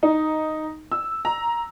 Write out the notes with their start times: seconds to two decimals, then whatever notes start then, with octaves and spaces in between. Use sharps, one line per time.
0.03 D#4
0.92 E6
1.25 A#5